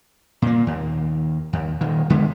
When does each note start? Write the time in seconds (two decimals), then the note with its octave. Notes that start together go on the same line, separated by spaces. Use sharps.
0.42 A#2 A#3
0.67 D#2
1.53 D#2
1.81 D#1 D#3
2.10 C#2 D3 G#3 B3